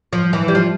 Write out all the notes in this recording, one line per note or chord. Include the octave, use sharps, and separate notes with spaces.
F3
E3
G3
F3